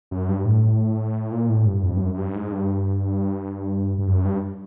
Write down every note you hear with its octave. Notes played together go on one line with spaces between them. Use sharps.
F#2
G2
A2
A#2
A2
G2
F2
G2
F#2
F#2
G2
G#2
G2
G2
F#2
G2